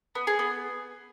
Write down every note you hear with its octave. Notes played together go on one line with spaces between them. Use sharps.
B3
G#4
B3